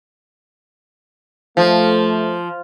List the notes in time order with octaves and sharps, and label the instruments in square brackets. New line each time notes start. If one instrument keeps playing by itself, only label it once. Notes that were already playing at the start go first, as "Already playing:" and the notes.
[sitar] F3 [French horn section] A3